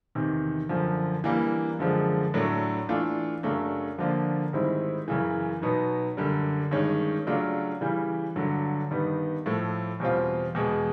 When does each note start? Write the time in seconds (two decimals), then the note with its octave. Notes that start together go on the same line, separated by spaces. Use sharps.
0.15 E2 C3 D#3
0.69 F#2 D3 F3
1.24 E3 G3 A#3 D4
1.79 F#2 D3 F3 G#3
2.34 A2 F#3 A3 D4
2.89 E3 A3 D4 F4
3.43 F#2 C#3 F#3 A3 D4
3.98 D3 F3 A#3 D4 F4
4.53 G#2 D#3 G3 C4 E4
5.08 F#2 C#3 E3
5.62 B2 F#3 B3 D#4
6.17 F#2 D3 G3
6.71 G2 D#3 G#3 C#4
7.27 C#3 F#3 A3 D4 F4
7.81 C#3 E3 G3
8.36 G2 D3 F#3
8.91 G2 D#3 G3 B3 D#4
9.46 A2 F3 A3
10.00 E2 B2 G3 C4 F4
10.55 E2 B2 G#3